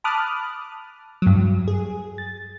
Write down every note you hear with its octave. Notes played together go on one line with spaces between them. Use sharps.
A5 B5 D6 D#6 F6 F#6
G2 F#3
G#4
A6